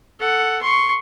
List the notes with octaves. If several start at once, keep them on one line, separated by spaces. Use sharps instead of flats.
A4 F#5
C6 C#6